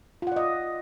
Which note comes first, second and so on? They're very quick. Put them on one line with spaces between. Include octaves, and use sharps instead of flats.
F4 F#5 D5 D#5